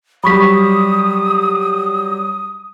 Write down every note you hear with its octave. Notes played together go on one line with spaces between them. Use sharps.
F#3 G3 B5 C#6 D#6 B6